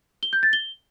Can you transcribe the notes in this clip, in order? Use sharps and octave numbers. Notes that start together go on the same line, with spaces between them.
G7
G6
A6
G7